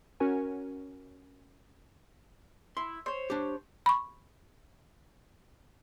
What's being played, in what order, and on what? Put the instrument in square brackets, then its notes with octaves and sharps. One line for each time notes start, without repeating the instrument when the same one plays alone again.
[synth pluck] C#4 F#4 A#4 G#5
[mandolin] E4 [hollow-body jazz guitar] C6
[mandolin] C5 C#5
[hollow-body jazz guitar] D4 G4
[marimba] B5 C#6